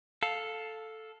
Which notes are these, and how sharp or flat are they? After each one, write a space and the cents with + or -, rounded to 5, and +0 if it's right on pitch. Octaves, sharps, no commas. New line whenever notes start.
A4 +0 F5 +10